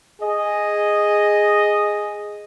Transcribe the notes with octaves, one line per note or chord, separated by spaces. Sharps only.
G#4 D#5